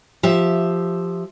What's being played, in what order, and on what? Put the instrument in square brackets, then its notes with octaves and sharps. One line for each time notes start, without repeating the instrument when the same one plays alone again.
[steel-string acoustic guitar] F3 G4 E5